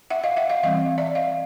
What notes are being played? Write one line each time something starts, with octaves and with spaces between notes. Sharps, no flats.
E5 F#5
D#5 F5
E5 F#5
D#5 F5
E3 G3 C4 D#5 F5
D5 E5
D#5 F5